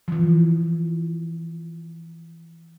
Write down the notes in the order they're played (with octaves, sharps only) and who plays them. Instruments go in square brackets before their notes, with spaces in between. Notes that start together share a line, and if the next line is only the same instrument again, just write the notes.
[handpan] E3 F3